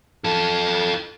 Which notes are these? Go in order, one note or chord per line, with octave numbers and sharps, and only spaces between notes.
F4 A4